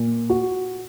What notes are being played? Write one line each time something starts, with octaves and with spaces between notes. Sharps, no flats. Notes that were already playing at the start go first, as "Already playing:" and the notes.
Already playing: A#2
F#4